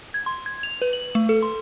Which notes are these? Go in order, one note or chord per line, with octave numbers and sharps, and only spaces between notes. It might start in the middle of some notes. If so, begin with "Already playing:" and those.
G#6
C6
G#6
F7
B4
F#7
A3
A4
C6